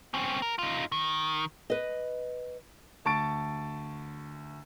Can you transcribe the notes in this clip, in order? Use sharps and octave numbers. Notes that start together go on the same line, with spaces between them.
C4 C#4
A#4
D#4 F4
D#3
B4 D#5
D2 A5 C#6 A6 D7